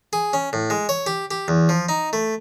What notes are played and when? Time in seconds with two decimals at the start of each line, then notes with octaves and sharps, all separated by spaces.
0.13 G#4
0.33 C#4
0.53 A2
0.70 G#3
0.89 C#5
1.06 G4
1.31 G4
1.48 E2
1.69 F3
1.89 D#4
2.13 A3